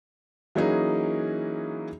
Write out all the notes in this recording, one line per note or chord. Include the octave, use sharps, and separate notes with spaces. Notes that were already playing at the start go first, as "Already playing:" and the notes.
E3 F#3 A#3 C#4 D#4 G#4